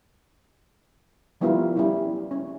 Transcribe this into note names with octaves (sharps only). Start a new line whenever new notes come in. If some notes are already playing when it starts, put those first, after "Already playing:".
F3 G3 B3 E4 F4 A#4
G3 C#4 E4
C#4